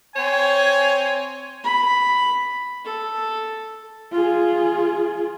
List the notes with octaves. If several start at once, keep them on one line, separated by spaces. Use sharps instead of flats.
C4 C#5 G#5
B5
A4
F4 G#4